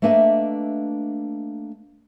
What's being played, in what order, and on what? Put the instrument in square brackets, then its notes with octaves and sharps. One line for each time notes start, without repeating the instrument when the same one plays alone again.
[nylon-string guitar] A3 A#3 D4 B4 D#5 E5